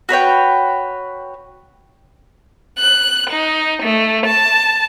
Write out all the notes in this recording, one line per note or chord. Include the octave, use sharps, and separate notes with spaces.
F#4 B4 C#5 G5
F#6
D#4
A3
A5